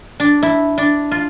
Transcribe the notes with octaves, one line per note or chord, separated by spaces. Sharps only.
D4
E4
D4
F4